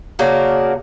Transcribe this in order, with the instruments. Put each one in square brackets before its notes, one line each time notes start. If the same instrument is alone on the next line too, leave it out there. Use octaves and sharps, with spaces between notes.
[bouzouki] C#3 A#3 D4 F#4